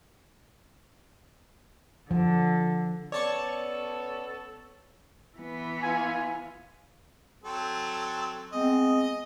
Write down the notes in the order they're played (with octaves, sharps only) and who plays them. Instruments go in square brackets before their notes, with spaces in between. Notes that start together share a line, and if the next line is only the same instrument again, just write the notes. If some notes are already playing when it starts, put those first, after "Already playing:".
[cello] D3 [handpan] F3
[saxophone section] B3 C#4 A4 [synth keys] C#5 A5 C#6 [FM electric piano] D5
[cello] E3 B3
[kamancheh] F4 [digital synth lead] G#5
[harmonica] F#3 C4 A4
[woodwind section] G#3 B3 C4 [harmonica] D#5